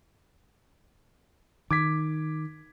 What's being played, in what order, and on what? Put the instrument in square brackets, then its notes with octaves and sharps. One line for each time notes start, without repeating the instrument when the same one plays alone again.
[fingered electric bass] D#3 [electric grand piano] D6 G#6 B6